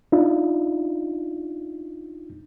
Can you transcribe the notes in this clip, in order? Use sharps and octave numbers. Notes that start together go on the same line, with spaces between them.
D4 D#4 F4